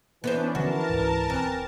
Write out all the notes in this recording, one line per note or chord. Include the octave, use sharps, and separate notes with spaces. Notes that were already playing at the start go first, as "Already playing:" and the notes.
E3 B3 C#4 D4 B4 C5
D3 F3 C#4 F#4 A#4 A5
C#2 G#2
D1 E3 C4